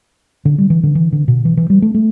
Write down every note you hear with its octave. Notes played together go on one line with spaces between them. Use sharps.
D3
G3
E3
D3
E3
D3
B2
E3
E3
G3
A3
A3